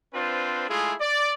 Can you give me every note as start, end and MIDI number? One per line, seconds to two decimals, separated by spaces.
0.14 0.67 60
0.14 0.67 62
0.14 0.67 65
0.14 0.67 71
0.14 0.67 72
0.68 0.94 56
0.68 0.94 57
0.68 0.94 64
0.68 0.94 65
0.68 0.94 68
1.00 1.33 74